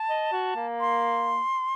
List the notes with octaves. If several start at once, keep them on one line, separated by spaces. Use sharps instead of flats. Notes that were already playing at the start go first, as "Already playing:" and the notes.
Already playing: A5
D#5
F#4
A#3
C6